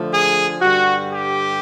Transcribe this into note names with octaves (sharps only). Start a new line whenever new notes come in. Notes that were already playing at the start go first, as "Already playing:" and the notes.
Already playing: D3 F3 A3
G#4
G2 D3 G3 F#4
G4